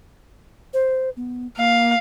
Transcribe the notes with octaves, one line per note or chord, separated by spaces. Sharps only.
C5
B3
A#3 F5